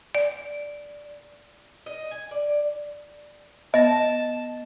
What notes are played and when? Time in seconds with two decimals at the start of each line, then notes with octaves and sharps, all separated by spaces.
0.15 D5
1.86 D#5
2.11 G#5
2.31 D5
3.74 B3 D#5 A5 A#6